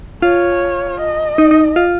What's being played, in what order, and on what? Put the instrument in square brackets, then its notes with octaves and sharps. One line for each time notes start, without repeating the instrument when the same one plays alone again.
[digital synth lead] F4 [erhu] C#5
[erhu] D#5
[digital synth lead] D#4
D#4
F4